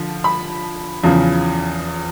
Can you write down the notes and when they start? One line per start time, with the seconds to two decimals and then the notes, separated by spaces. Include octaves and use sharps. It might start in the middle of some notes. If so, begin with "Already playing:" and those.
Already playing: D3 F3
0.24 B5
1.04 E2 C#3 F3